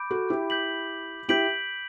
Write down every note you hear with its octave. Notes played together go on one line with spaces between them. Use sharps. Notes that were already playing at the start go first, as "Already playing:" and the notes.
Already playing: B5 D6 G6 D7
F#4 A4
E4 G4
G6 B6 F#7
E4 G4 G6 B6 D7 F#7